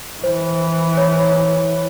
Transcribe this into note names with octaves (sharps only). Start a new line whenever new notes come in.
E3 C5
C#5